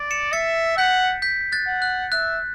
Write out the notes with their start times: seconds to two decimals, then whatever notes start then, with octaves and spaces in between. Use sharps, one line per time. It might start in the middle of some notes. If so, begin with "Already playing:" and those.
Already playing: D5
0.11 C#7 E7
0.33 E5 A6 C#7
0.77 F#5 G6 B6
1.22 G6 B6
1.52 F#6 A6
1.67 F#5
1.82 F#6
2.12 E5 F#6